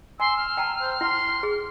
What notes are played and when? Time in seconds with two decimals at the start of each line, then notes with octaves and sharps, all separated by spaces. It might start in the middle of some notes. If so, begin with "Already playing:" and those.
0.20 G#5 C6 E6
0.37 F6
0.57 G5 A5 A#5
0.81 C5
1.01 E4 F#5 C6
1.43 G#4